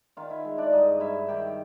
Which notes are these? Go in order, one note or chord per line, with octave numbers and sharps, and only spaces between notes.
D#3 F4 F5
E4 E5
G#3
D4 D5
G2 D#4 D#5
G2 E4 E5
D#3 G4 G5